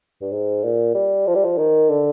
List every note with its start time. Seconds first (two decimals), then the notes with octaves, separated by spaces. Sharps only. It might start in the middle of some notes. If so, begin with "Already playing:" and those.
0.22 G2
0.32 G#2
0.64 A#2
0.95 G3
1.27 F3
1.35 G3
1.45 F3
1.58 D#3
1.89 D3